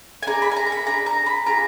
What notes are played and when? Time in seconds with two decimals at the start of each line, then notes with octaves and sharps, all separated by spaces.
0.23 G#5
0.27 D4 G#4 A#5
0.42 B5
0.51 G#5
0.57 A#5
0.67 A#5
0.72 B5
0.86 D4 G#4 A#5
1.06 A#5
1.26 B5
1.46 D4 F4 G#4 A#5